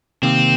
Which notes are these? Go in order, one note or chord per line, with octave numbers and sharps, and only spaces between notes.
C3 D#3 A#3 C4 G4